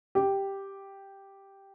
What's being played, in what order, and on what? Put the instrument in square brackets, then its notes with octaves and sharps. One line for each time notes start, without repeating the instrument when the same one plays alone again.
[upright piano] G4